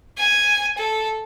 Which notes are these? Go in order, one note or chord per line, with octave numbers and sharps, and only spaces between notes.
G#5
A4